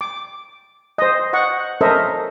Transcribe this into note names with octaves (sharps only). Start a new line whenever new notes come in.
D6
C5 D#5
D#5 F#5 C#6
C#4 A4 A#4 C5 D#5 E5